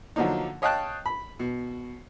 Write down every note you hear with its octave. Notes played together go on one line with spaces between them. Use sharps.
D3 F3 F#3 A#3 D4 D#4
C#5 D#5 F5 G5 A5 F#6
B5
B2